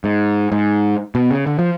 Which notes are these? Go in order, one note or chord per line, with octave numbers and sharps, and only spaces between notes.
G#2
G#2
B2
C#3
D3
F3